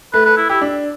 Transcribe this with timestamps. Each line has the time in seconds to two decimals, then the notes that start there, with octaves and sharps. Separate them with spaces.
0.14 A3 B4
0.25 A4 B4
0.37 E4
0.49 E4 G4
0.62 D4